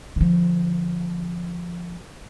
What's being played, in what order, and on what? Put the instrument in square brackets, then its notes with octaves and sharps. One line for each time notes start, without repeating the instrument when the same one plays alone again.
[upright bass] D3 F3